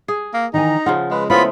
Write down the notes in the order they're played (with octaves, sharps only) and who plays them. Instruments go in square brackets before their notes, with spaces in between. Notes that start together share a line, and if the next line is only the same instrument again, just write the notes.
[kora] G#4
[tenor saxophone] A#3
[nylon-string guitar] D#3 E3 G#5 [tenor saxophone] D#4 [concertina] A#5
[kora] C#3 F3 F4 [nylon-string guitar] F#5
[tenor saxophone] G#3 [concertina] B4
[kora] G#3 A3 [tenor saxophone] B3 [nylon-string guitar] E4 C5 C#5 [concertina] F4 B5